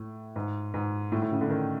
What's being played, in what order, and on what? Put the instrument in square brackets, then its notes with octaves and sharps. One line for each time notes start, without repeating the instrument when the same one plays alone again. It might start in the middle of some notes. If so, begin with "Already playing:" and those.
Already playing: [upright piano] A2
G#2
G#2
A2
A2
C#3
D3
D#3